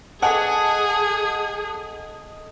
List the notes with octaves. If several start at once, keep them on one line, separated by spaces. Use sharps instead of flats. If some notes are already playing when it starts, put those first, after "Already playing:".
G#4 A4 D#5 F#5 G#5 A5 D#6